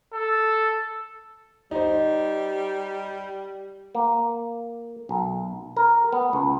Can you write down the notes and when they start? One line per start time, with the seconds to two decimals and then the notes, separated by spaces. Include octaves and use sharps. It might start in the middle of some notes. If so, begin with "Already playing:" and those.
0.13 A4
1.71 G3 D#4 C5
3.95 A#3
5.09 B1
5.77 A#4
6.12 B3
6.33 C#2